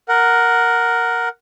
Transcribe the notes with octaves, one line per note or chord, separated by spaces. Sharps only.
A#4 F#5